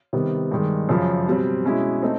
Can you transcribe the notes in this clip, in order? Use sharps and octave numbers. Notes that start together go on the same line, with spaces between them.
C3 D#3 G3 B3
G2 D#3 G#3
F#2 C#3 F3
B2 G3 C4
B2 G#3 C#4 E4
A3 C4 D#4